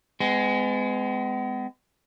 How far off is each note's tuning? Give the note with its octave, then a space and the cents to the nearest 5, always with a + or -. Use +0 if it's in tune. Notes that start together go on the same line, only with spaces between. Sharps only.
G#3 +0 B3 +45